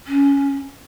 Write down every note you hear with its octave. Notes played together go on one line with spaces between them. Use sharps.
C#4